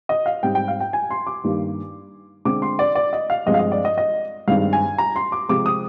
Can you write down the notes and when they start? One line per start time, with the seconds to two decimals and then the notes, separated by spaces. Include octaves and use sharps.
0.09 D#5
0.26 F5
0.43 G#2 G3 C4 G5
0.55 G5
0.68 F5
0.80 G5
0.93 G#5
1.11 C6
1.27 D6
1.44 G2 D#3 G3 A#3
2.45 D3 G#3 C4 D6
2.62 C6
2.79 D5
2.95 D5
3.13 D#5
3.30 F5
3.46 G2 F3 G#3 C4 D#5
3.54 F5
3.59 D#5
3.72 D5
3.85 D#5
3.98 D#5
4.48 G2 D#3 G#3 C4 F5
4.73 G#5
4.98 A#5
5.16 C6
5.32 D6
5.49 C3 F3 G#3 C4 D6
5.66 D#6